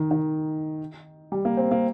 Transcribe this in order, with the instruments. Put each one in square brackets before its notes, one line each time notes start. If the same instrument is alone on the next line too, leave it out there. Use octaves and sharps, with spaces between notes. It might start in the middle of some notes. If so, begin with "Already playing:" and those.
Already playing: [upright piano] D#3
D#3
G3
A#3
C4
A#3